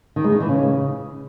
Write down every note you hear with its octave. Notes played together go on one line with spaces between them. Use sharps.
D#3
G#3
D#4
E3
C#3